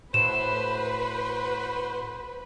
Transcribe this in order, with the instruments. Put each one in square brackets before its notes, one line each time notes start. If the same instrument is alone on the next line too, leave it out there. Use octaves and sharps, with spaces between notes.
[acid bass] A2 [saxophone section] F#4 C5 [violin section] B4 [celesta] E7